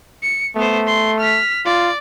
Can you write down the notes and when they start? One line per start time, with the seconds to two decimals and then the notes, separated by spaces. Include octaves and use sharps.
0.23 C#7
0.56 A3 B3 C5
0.87 C6
1.20 F6 B6
1.66 F4 D5